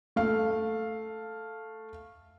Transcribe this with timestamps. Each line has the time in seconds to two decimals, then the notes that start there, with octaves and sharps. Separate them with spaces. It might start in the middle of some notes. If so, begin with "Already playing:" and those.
0.16 A3 F5